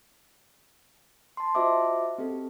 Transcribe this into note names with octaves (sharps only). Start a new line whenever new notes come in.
A5 C6
F4 F#4 C5 D#5 E5 D6
C4 G4 A4